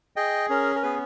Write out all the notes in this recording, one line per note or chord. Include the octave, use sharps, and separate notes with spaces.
G#4 D#5 G5
C#4 A#4
A#4
B3 G#4 B4